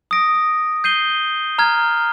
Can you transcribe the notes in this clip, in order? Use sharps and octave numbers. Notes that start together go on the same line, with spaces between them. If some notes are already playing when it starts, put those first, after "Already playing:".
D#6 A#6 D7
G6 C7 D#7 G7
A#5 F6 G#6